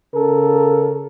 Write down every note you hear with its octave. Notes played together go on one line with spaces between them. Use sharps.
C#3 A4 A#4